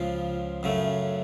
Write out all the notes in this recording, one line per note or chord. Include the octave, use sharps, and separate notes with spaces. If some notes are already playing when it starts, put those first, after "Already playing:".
Already playing: C#2 C#3 F3 F4
F#2 C#3 A3